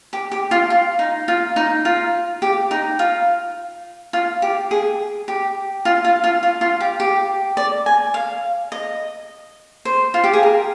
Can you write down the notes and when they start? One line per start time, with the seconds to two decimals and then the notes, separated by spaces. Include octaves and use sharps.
0.13 G4
0.32 G4
0.51 F4
0.70 F4
0.99 D#4
1.28 F4
1.56 D#4
1.85 F4
2.42 G4
2.71 D#4
2.99 F4
4.13 F4
4.42 G4
4.71 G#4
5.28 G4
5.85 F4
6.05 F4
6.24 F4
6.43 F4
6.61 F4
6.80 G4
7.00 G4
7.57 D5
7.86 G#5
8.14 F5
8.72 D#5
9.85 C5
10.14 F4
10.24 G4
10.33 G#4
10.43 A#4